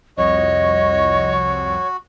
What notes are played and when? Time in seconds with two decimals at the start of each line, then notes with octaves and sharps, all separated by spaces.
0.17 C2 F2 F#4 C#5 D#5